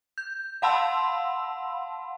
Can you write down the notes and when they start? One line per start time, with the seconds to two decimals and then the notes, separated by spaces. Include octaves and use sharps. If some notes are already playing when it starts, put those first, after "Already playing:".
0.18 G6
0.62 F5 F#5 A5 B5 C6 E6